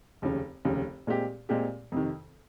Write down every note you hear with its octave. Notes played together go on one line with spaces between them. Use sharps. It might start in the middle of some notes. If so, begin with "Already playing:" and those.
F1 D#2 C#3
F1 D#2 C#3
A#2 G#3 C4 G4
A#2 G#3 C4 G4
F2 C3 D#3